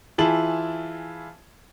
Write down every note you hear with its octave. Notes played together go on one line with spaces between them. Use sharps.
E3 E4 F4 G#4 A5 F#7